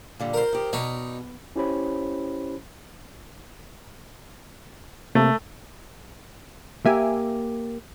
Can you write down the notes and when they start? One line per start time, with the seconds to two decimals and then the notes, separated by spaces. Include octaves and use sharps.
0.20 A#2 D3 G3
0.34 A#4 C5
0.53 D#3 G4
0.73 B2 D#4 C#5 D5
1.56 C#4 E4 G4 C5 C#5 B5
5.15 C3 A3 A#3
6.86 A#3 G4 E5 G#5